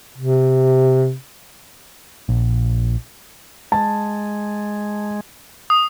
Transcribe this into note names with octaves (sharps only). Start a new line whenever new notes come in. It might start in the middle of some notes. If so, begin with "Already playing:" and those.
C3
A#1
G#3 A5
D#6